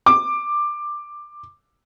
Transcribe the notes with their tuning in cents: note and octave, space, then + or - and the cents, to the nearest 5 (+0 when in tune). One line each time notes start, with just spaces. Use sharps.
D6 +10